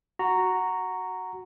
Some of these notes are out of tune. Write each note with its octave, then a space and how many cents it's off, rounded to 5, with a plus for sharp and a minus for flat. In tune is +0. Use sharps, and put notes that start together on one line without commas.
F#4 +0 A#5 -5